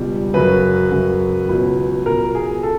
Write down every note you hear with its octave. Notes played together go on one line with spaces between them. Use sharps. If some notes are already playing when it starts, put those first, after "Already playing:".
Already playing: C#2 B2 G3
F#2 C#3 F#3 B4
F#2 C#3 F#3
C#2 B2 F#3
C#2 B2 F#3 A#4
G#4
A4